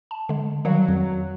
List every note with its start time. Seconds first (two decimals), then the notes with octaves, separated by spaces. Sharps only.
0.11 A5
0.29 D3 G#3
0.65 D#3 F#3 G3 F5
0.88 F2